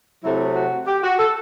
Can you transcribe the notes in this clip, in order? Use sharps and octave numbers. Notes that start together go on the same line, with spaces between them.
C3 F#3 A3 E4
F#4
G4
F#4
A4